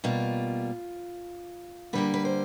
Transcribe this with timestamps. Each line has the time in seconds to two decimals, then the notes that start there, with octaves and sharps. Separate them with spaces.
0.04 B2 G3 A#3 F4
1.93 D3 G3 A#3 B4
2.14 B4
2.25 C5